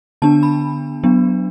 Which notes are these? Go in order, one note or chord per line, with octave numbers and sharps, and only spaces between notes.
D3 B3 D4 A5
B5
F#3 B3 D4